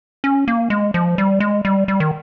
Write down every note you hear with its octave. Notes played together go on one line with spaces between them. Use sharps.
C#4
A#3
G#3
F3
G3
G#3
G3
G3
D#3